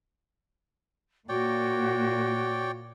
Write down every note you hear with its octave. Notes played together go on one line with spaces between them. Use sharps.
A#2 F#4 C#5 D5 G5